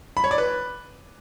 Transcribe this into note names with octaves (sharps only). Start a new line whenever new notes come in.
B5
C#5
D5
B4